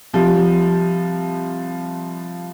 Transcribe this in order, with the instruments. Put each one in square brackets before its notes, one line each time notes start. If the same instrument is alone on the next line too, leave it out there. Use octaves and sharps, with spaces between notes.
[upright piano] C2 F3 G3